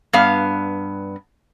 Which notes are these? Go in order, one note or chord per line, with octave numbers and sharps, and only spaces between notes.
G2 B3 F5